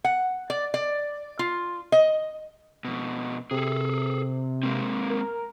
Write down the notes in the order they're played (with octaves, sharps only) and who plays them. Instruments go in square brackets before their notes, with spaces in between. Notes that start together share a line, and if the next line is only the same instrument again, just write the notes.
[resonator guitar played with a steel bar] F#5
D5
D5
F4
D#5
[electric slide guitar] F2 B2
[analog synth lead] C3 [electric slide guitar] G#4 A4
[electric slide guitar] G#3 A#3 C4
[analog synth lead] A#4